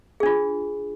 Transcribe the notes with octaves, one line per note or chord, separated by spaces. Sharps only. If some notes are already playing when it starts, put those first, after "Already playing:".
D4 F4 G#4